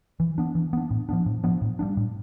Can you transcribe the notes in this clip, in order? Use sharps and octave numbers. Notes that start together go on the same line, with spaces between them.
E3
B3 D4
E3
B3 D4
A2
F3 B3 D4
A2
F3 B3 D4
A2
G3 B3 D4
A2